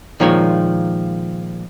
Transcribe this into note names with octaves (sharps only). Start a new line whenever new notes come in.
A#2 D#3 F3 G#3 C#5